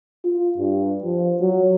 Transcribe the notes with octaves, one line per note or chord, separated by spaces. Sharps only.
F4
G2
F3
F#3